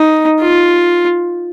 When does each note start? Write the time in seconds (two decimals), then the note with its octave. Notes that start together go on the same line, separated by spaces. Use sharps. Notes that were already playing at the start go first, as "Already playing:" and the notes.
Already playing: D#4
0.40 F4